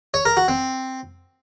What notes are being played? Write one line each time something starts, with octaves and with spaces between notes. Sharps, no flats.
C#5
A#4
F#4
C4